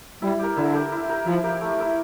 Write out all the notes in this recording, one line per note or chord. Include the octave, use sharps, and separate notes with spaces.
G3 E4
G4 A#4
D3 E4
G4 A#4
E4
G4 A#4
F3 E4
G4 A#4
A3
E4 A#4